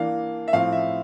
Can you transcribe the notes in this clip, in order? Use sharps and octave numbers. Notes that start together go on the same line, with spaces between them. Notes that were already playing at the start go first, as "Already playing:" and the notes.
Already playing: E3 A#3 D4 F5
E5
A2 F3 C4 F5
E5